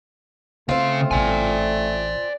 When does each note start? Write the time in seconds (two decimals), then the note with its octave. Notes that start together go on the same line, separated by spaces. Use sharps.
0.69 C#3 A3 C4 E4 F4 F5
1.11 A1 A#2 D5 G#5